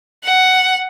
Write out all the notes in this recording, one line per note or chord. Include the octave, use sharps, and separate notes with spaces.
F#5